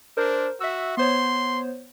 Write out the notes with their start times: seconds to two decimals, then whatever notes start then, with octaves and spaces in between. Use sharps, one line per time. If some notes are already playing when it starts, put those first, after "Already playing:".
0.17 D4 A#4 C5
0.60 F#4 E5 E6
0.97 B3 C5 C#5 C6